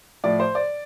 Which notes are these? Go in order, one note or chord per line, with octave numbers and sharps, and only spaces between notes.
A2 F3 D5
C5
D5